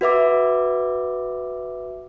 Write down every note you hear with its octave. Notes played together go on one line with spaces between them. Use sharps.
F#4 B4 E5 D6